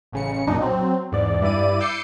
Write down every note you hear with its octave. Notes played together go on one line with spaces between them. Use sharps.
A1 C#3 C#7
B1 F#2 A#2 D4 D#4
F#3 C4
E2 G#2 D5
G2 E4 D5 D#7
D6 E6 G6 C7 C#7 D#7